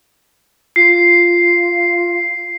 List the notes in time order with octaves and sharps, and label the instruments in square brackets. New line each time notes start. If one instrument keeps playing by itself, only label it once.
[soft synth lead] F4 [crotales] C7